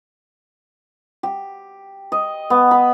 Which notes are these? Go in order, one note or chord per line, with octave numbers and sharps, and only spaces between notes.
G4
D#5
B3
B5